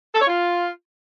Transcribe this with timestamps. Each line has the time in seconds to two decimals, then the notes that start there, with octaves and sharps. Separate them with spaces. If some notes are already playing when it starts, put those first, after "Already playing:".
0.15 A4
0.21 C#5
0.27 F4